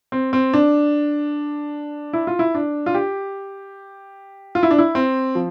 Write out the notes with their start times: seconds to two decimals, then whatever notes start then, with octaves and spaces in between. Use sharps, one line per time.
0.12 C4
0.33 C4
0.53 D4
2.13 E4
2.27 F4
2.39 E4
2.55 D4
2.86 F4
2.95 G4
4.55 F4
4.63 E4
4.71 D4
4.78 E4
4.95 C4
5.35 F3